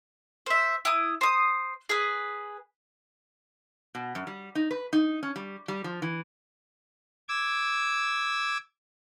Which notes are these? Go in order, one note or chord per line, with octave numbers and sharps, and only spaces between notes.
C5 E5
E4 D#6
C5 D#6
G#4 B4
B2
F#2
G3
D#4
B4
D#4
C#4
G3
G3
F3
E3
D6 E6 G#6